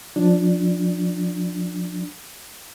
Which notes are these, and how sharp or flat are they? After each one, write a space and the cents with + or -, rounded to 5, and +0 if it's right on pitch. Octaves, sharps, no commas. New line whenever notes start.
F3 +25 D4 +0